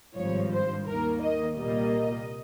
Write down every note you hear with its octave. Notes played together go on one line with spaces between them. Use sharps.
G#1 G2 F3 C#5
C5
D#2 D#3 A#3 A#4
D#5
C2 A#2 G3 A#3 D#5